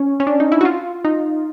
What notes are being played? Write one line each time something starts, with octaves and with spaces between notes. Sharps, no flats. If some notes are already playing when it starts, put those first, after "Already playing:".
Already playing: C#4
C#4
D4
D#4
E4
F#4
F4
D#4